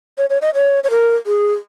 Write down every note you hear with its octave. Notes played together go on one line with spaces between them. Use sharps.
C#5
C#5
D#5
C#5
C#5
A#4
G#4